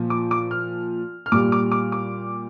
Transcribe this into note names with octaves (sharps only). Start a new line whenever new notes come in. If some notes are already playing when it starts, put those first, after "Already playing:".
Already playing: A#2 F3
D6
D6
F6
F6
A#2 G3 D6
D6
D6
D6